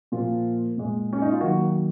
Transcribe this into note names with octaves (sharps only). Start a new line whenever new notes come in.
A#2 F3 A#3 F4
A#2 G#3
C#4
D#4
F4
D#3 F#3 A#3 F#4